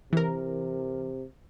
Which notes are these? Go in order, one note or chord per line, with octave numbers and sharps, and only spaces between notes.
C3 E3 A#4